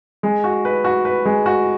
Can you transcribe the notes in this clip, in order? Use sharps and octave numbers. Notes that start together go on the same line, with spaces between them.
G#3
F#4
B4
F#4
B4
G#3
F#4